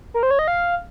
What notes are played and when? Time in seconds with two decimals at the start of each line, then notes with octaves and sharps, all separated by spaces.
0.14 A#4
0.23 C5
0.31 C#5
0.39 D#5
0.48 F5